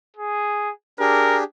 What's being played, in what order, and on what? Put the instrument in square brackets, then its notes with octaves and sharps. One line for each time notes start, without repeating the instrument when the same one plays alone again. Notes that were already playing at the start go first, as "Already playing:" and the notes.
[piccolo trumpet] G#4
[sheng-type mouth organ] D4 G4 G#4 [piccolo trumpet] A#4